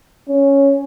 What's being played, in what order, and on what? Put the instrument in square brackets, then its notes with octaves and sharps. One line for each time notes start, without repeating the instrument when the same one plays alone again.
[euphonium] C#4